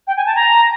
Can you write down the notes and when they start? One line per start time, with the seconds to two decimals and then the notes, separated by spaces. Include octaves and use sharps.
0.07 G5
0.16 G#5
0.26 A5
0.35 A#5